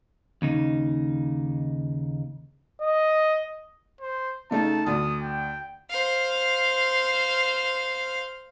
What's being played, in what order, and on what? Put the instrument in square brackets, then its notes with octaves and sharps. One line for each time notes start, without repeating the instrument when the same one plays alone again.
[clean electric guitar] D#2 C#3 D#4
[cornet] D#5
[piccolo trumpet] C5
[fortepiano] C#3 A3 D#4 [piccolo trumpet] A5
[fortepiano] D2 [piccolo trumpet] D#6
[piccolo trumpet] G5
[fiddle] C5 F5